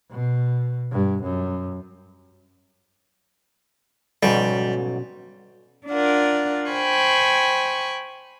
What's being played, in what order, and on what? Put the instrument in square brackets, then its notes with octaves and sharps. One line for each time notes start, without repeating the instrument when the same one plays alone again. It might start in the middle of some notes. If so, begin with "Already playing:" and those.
[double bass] B2
G2
F#2
[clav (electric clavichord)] B1 G#2 [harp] B2 F#3 C#4 [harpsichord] G3
[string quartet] D4 F4 A#4 F#5
C5 G5 G#5 B5 C#6